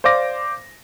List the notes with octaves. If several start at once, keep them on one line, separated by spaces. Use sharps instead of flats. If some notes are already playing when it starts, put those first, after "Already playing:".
C5 D5 F5 D6 A#6